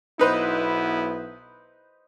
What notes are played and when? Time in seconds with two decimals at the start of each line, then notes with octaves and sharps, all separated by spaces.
0.19 B1 B3 D#4 E4 B4 C5